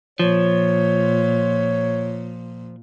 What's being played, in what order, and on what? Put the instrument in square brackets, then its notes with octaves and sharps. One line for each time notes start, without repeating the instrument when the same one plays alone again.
[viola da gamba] A#2 [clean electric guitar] F3 [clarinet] C#5